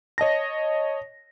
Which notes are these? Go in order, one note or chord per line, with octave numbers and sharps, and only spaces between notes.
C#5 D#5 A5 A#6